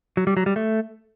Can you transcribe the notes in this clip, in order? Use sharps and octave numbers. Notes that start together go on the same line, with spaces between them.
F#3
G3
F#3
G3
A3